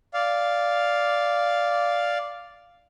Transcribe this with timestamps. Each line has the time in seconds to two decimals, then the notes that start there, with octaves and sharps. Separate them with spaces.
0.14 D5 F5